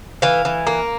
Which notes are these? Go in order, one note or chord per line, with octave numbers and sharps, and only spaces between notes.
E3 F5
E3
A#3